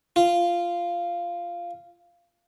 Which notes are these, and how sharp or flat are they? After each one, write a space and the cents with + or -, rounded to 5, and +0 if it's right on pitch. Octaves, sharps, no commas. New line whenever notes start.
F4 -10